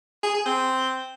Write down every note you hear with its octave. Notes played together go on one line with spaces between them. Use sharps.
G#4
G#4
C4